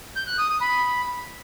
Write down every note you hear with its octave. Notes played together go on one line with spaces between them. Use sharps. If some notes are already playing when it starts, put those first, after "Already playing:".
G6
F#6
D#6
D#6
B5